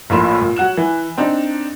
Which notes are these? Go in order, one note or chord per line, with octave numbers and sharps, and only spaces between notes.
A#1 A2 A#3 F4 B5 E7
A#2
F#3 F#5 F#6 E7
E3
C4 D4 D#4